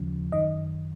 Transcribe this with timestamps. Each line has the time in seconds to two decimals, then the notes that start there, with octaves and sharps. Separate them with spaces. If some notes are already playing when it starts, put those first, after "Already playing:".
Already playing: D#2 C#3 F3
0.32 F#2 D#3 D#5